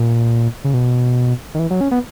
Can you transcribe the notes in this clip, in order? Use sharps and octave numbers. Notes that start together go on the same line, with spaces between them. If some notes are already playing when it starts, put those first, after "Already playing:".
Already playing: A#2
C#3
B2
D#3
E3
F#3
C#4
B3